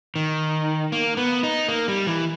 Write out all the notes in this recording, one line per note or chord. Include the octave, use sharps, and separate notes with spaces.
D#3
A#3
B3
D#4
A#3
G3
E3